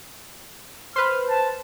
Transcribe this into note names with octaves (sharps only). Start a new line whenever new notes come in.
B4 C5 F6
A5